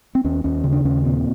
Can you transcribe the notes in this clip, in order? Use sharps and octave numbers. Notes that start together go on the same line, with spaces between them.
C4
D#2 C#4
D#2 C#4
C#3
D4
D#2 C#4
A#2 C4